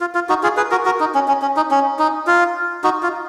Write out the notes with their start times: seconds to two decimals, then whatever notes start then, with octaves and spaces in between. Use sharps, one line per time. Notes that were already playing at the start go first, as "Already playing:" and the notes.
0.01 F4
0.15 F4
0.29 D#4 F#4
0.43 F4 G#4
0.57 G#4 B4
0.71 F#4 A#4
0.85 F#4 A#4
1.00 D#4
1.15 C#4
1.28 C#4
1.42 C#4
1.57 D#4
1.71 C#4
1.99 D#4
2.27 F4
2.84 D#4 F#4
3.03 F4